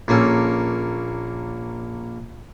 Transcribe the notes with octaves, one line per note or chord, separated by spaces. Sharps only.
A#1 A#3 C#4 A4